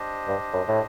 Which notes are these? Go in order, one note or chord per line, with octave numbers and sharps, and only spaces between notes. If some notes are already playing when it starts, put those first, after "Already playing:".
Already playing: D4 G4 C5 D#5
G2
F#2
A2